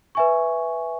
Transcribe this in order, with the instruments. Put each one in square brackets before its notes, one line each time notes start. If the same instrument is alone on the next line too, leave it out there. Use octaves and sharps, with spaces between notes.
[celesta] B4 E5 G#5 C#6